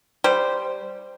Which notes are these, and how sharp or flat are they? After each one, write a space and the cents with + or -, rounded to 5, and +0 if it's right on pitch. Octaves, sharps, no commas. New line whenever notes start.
G3 +0 C5 -10